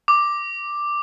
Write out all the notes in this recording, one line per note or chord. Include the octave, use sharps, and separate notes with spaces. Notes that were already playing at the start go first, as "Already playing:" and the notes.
D6